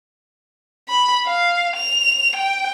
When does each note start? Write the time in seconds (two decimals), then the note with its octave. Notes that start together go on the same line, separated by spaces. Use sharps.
0.89 B5
1.27 F5
1.76 F7
2.36 G5